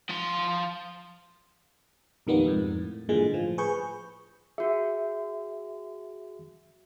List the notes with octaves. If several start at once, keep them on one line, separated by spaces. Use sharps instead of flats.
F3 C6
B1 F2 D#3 G3 A#3 B3
F2 G#2
A2
G2 A#2 D3 E3 G#3
A2 F3
G#4 B4 C#6 G6
F#4 G#4 E5